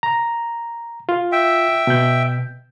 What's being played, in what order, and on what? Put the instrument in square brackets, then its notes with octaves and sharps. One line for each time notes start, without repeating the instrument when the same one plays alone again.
[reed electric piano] A#5
F4
[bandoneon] E5 G5
[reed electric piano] B2 G6